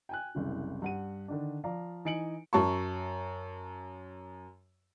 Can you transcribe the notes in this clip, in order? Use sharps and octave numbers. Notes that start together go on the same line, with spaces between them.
G5 G#5 F#6
F#1 C2 C3
G2 F#5 D#7
D3 D#3 D4
F3 D5 F5 A#5
E3 D#4 G#5 C#7 D7 F#7
F#2 A5 C#6